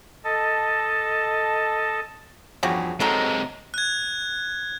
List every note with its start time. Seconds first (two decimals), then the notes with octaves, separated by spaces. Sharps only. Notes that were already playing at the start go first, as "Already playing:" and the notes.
0.24 A4 D#5 A5
2.63 E2 G2 C#3 F3 F#4 G4
3.00 C3 F#3 G#3 D#4 A4 A#4 D#5
3.74 F#6 G#6